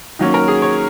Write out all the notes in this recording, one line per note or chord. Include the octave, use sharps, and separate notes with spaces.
D#3 F#3 A#3 C#4
A#4
G#4
C#5